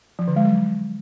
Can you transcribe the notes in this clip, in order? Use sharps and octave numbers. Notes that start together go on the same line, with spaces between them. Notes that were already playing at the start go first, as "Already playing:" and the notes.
F3
D3
G#3
F#3